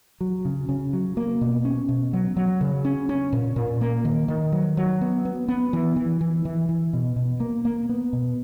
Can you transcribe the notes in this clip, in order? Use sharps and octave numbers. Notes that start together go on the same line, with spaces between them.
F#3
C#3
C#3
F#3
A#3
B2
C#4
B2
F#3
F#3
C#3
C#4
C#4
A#2
A#2
A#3
D#3
D#3
F#3
F#3
B3
B3
B3
E3
E3
E3
E3
E3
B2
B2
A#3
A#3
B3
B2